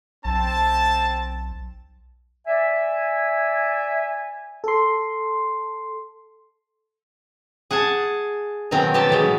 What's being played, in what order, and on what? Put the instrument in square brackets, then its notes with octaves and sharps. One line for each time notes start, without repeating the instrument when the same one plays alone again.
[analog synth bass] B1 [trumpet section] C4 A5
[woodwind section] D5 E5 G#5
[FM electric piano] A4 C6
[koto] G#4 F#5 G#5 A5
B2 D#3 F#3 C4 C#4
B3 G4 A5
A2 E3 F#3 G#3